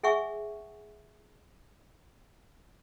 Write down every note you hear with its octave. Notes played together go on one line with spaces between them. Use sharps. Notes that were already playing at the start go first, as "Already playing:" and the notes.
G#4 E5 F#5 G#5 C#6 E6